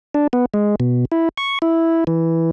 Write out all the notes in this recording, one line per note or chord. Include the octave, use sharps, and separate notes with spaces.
D4
B3
G#3
B2
E4
C#6
E4
E3